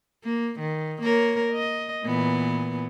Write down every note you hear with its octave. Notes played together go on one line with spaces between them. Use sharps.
A#3
D#3
A#3 A#4 C#5
D#5
A#2 E3 B3